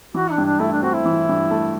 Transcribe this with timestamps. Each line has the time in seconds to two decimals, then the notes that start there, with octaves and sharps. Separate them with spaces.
0.15 E3 F#4
0.31 D4
0.38 G2
0.45 D4
0.60 A3 E4
0.72 D4
0.83 C4 F#4
0.94 E4
1.06 E3
1.29 G2
1.51 A3